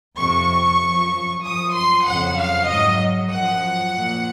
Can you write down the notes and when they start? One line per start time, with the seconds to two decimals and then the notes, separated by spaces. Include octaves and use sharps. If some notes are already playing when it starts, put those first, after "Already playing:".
0.17 F2 C3 F3 C#6
0.80 F#2 F3
1.43 F#2 F3 D#6
1.74 C6
2.05 F2 C#3 F#3 F#5
2.36 F5
2.67 G#2 F#3 D#5
3.30 F#2 F3 F#5
3.93 A#2 F3